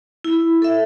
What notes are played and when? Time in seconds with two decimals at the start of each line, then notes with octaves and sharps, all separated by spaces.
0.24 E4
0.62 A4 E5